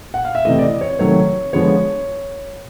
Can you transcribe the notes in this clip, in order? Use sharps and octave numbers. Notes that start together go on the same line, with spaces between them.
F#5
F5
E5
C3 E3 A3 D#5
D5
D#5
C#5
C3 D#3 F#3 A3 C#5
D3 F3 G#3 B3 C#5